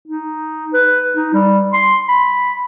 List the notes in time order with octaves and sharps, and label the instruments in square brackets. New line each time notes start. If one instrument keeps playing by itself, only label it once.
[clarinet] D#4
B4
D#4
G3
C6
B5